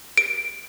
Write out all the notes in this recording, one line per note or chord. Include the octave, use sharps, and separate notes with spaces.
D7